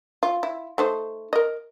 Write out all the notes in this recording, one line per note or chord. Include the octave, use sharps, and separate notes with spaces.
F4
E4
A3 D#4 C5
A#4 D#5